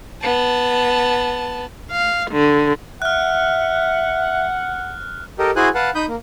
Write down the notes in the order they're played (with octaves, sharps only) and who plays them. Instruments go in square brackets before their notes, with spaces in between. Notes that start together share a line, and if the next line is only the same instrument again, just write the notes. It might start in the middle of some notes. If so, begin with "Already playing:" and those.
[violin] B3 A5
[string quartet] F5
D3
[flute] E5 [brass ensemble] F#5 [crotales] F6 F#6
[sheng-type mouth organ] G4 A4 A#4 D#5
E4 F#4 G#4 C5 G#5 F#6
B4 F5 F#5 A5
D#4 B5 D#6 G6
A#3